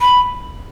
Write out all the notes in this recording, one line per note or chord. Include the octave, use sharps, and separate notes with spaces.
B5